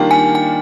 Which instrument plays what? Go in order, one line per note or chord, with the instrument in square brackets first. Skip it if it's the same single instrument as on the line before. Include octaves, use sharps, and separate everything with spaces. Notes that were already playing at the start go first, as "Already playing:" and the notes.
Already playing: [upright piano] D#3 G3 A#3 D4 F4 [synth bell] G5
[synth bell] G#5
G#5